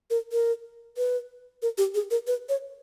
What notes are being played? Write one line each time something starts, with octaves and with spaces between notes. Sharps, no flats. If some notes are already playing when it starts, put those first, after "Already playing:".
A#4
A#4
B4
A#4
G4
G#4
A#4
B4
C#5